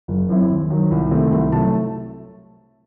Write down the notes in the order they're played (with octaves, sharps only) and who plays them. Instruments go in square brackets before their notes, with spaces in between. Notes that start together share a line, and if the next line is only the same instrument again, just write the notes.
[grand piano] F#1
F#2 E3 C4 E4
D#2
D#3 F#3
C2
C3 D#3 A3 C4
C2
C3 F#3 A3 A5